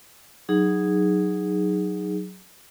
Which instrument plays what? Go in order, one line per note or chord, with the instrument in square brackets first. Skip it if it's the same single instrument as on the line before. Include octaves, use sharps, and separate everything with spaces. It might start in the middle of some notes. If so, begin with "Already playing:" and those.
[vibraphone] F#3 D#4 G#4